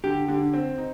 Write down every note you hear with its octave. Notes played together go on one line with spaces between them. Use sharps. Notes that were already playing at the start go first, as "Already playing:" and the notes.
D3 G4
D3
C4
D#4